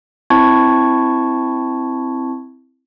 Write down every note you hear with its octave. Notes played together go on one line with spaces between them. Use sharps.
C4 E4 A5 C#6 G#6